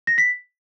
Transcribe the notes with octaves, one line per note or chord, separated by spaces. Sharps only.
A#6
B6